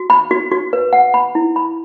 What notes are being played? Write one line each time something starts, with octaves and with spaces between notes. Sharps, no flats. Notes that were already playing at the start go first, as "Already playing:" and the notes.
Already playing: F#4
B5
F#4
F#4
B4
F#5
B5
E4
B5